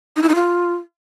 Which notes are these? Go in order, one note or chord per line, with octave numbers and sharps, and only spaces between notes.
D#4
E4
D#4
F4